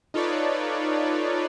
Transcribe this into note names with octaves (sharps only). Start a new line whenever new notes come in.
D#4 F4 A4 B4 C#5 D5